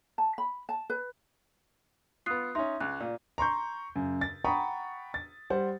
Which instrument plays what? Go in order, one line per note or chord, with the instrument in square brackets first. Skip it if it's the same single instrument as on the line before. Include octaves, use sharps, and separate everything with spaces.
[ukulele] A5
B5
A5
B4
[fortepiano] B3 F4 [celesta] D#6 F#6 C7
[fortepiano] C#4 D#4 [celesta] E5 C6
[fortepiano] C#2 [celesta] F#6
[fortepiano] A#2 [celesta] D5
[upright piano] A#5 C6 C#6 G6
F#2 C#3
A6
F#5 G5 A#5 B5 C#6 D#6
A6
G3 C5 F#5